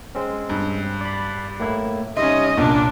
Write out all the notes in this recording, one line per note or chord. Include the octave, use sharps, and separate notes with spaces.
G#3 C4 C#4
G2
D5 B5
A2 A#3 E4
C3 G3 C#4 D#4 D#5 E5 C6
C2 A#2 C#4 D4